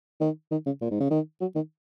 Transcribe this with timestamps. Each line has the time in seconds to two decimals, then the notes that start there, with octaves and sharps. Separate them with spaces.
0.21 D#3
0.51 D#3
0.66 C#3
0.81 A#2
0.91 G#2
1.00 C#3
1.11 D#3
1.41 F#3
1.55 D#3